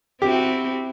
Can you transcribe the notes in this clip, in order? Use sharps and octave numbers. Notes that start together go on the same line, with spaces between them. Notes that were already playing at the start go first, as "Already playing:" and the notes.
C4 E4 F#4 G4